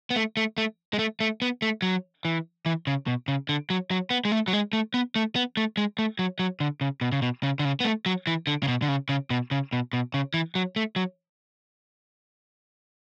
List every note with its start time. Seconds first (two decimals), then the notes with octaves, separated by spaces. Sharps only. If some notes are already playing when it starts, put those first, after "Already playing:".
0.10 B3
0.16 A3
0.37 A3
0.58 A3
0.93 G#3
0.99 A3
1.20 A3
1.42 B3
1.62 A3
1.82 F#3
2.25 E3
2.66 E3
2.87 C#3
3.07 B2
3.28 C#3
3.49 D3
3.70 F#3
3.91 F#3
4.10 B3
4.25 G#3
4.32 A3
4.48 F#3
4.53 G#3
4.73 A3
4.94 B3
5.16 A3
5.36 B3
5.57 A3
5.77 G#3
5.99 A3
6.19 F#3
6.39 F#3
6.60 D3
6.81 C#3
7.01 B2
7.12 C#3
7.22 B2
7.43 C#3
7.59 D3
7.65 C#3
7.80 B3
7.85 A3
8.06 F#3
8.27 E3
8.47 D3
8.63 C#3
8.68 B2
8.82 D3
8.88 C#3
9.09 C#3
9.30 B2
9.51 C#3
9.73 B2
9.93 B2
10.14 C#3
10.34 E3
10.55 F#3
10.76 A3
10.96 F#3